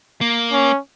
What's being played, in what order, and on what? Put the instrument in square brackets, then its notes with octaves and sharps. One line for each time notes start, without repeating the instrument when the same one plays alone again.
[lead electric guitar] A#3
[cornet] C#4